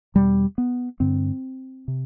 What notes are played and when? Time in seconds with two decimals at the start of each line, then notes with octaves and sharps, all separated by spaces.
0.15 E2 B2 G3
0.58 B3
1.00 G2 D3 C4
1.88 C3